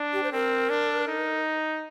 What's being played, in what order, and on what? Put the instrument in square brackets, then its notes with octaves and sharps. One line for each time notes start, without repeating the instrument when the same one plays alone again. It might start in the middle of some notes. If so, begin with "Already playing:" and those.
Already playing: [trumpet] D4
[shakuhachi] G4
C5
[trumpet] C4 [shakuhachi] A#4
[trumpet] D4
D#4